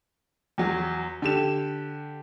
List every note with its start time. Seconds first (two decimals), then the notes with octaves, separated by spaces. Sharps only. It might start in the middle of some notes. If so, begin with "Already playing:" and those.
0.58 E2 F#3
1.22 D3 G4 E7